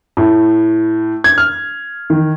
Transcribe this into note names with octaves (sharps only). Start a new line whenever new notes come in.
A2
G#6
F6
D#3